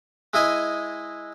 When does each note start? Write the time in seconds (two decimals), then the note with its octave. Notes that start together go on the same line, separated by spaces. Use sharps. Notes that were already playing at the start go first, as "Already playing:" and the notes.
0.34 G#3 E4 D#5 G#5